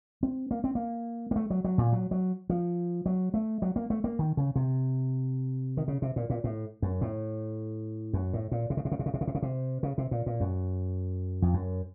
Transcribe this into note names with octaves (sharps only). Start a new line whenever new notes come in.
C4
A#3
C4
A#3
A#3
A3
F#3
F#3
A#2
F#3
F#3
F3
F#3
A3
F#3
A#3
A3
A#3
D#3
C#3
C3
D#3
C#3
C3
A#2
A#2
A2
F#2
A2
F#2
A2
A#2
C3
C#3
C3
C#3
C3
C#3
C3
C#3
C3
C#3
C3
C#3
C3
A#2
A#2
F#2
F2
F#2